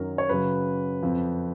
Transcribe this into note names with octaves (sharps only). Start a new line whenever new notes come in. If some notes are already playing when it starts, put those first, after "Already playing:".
Already playing: F#2 D#3 F#3 A#4
C#5
F#2 C#3 F#3 B4
F2 F3